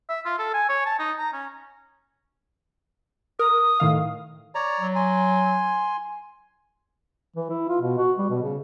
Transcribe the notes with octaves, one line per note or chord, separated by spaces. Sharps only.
E5
F4
A4
G#5
C#5
A5
D#4
A#5
C#4
A#4 D#6
A2 D#3 F5
C#5 D5 A#5
F#3
G#5 C6
E3
E4
F4
B2
F#4
G3
B2
C#3